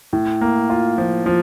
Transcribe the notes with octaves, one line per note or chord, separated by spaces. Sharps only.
A2
A#3
F4
F3
F3